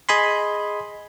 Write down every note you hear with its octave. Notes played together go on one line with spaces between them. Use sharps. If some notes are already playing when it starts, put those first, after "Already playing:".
G#4 D#5 G#5 B5 C6